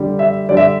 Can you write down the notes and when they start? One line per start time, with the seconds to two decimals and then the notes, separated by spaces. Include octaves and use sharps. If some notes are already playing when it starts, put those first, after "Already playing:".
Already playing: D3 G3
0.19 E5
0.49 D3 G3 D5
0.57 E5